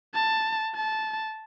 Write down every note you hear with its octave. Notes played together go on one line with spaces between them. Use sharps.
A5
A5